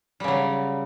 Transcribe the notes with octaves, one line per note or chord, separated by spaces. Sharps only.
C#3 F#3 G3